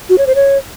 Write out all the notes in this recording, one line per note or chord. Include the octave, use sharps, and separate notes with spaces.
F#4
C#5
C5
C#5